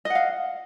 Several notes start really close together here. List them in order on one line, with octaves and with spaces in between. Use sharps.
D#5 F#5 F5